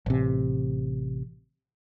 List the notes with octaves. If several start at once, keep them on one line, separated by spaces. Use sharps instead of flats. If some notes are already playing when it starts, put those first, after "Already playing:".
A1 C3